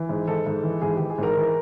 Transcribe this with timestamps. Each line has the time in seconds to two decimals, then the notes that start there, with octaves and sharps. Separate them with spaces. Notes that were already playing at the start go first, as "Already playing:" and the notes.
Already playing: E3
0.09 G#2
0.27 G#2 A4
0.46 G#2
0.63 E3
0.81 G#2 G#4
0.96 E3 G4
1.10 G#4
1.18 G#2 A#4
1.37 E3